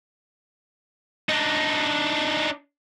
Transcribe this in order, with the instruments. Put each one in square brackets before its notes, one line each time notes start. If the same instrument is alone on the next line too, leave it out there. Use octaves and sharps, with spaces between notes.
[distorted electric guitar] D4 D#4